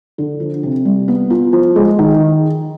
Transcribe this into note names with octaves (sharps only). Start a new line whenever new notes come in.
D3
F3
C3
G3
B3
F4
F3
G#3
D#3